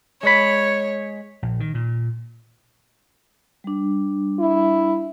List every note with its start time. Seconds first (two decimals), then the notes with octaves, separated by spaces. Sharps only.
0.23 G#3 C#5 B5
1.42 A#1
1.60 D#3
1.74 A#2
3.64 G3 D4
4.39 E4